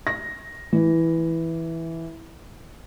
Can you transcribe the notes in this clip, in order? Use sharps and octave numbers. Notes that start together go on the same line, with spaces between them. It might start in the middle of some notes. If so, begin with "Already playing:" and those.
A#6
E3